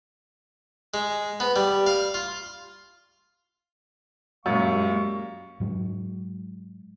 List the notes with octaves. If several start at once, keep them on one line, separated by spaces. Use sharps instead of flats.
G#3
B3
G3
F5
F4
F#2 A#2 G3 G#3 F5 C#6
G#2 F#3 G#3